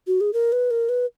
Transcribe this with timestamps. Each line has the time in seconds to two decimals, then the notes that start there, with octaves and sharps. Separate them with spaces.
0.07 F#4
0.21 G#4
0.33 A#4
0.52 B4
0.71 A#4
0.89 B4